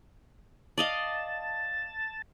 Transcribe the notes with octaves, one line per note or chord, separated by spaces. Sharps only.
D5 D#5 F5 A5